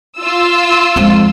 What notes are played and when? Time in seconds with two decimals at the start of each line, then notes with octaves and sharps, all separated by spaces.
0.19 F4 E6
0.96 F2 G#3